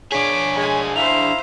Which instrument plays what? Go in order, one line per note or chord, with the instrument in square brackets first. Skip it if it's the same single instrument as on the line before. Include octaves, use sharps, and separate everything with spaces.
[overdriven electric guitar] D4 G#4 [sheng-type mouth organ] C#5 [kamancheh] D6 [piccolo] B6
[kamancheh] G#3 G#5
[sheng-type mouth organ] E4 F5 A#5 [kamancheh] C5 E5 [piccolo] F7